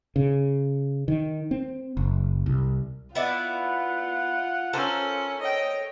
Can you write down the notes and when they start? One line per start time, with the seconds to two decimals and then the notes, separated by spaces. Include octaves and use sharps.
0.16 C#3
1.08 D#3
1.51 C4
1.97 F#1
2.46 C2
3.15 B3 E4 F4 D5 F#5
4.73 C#4 A4 A#4 C5
5.41 C#5 D#5 G5